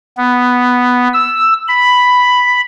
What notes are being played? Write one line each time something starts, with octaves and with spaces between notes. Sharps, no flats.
B3
E6
B5